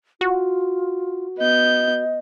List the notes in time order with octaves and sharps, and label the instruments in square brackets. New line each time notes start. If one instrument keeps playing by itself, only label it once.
[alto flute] F4 [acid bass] F#4
[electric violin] B3 G6 [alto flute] D#5